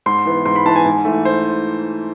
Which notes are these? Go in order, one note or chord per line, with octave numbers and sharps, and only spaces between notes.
G#2 C6
E3 B3
G#2 C6
B5
E3 B3 A5
G#5
G#2
E3 A3
C5